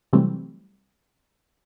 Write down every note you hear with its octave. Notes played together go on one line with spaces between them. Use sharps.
C3 E3 F#3 G3 A3 C4